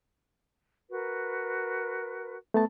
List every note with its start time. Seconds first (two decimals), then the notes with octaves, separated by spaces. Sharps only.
0.90 F#4 A#4 B4
2.54 A3 B3 A5